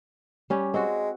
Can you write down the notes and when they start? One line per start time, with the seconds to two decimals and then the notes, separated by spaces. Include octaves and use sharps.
0.50 G3 C#4 G4
0.74 G#3 C4 F#4